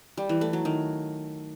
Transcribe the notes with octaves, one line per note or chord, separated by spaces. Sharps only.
G3
E3
A3
F#3
D#3